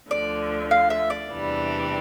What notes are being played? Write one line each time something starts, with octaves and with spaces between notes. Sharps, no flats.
D2 D3 F3 D5
F5
E5
D5
E2 C3 E3 G3 D4